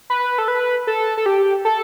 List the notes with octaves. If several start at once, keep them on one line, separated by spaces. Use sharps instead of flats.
B4
A4
B4
A4
A4
G4
A4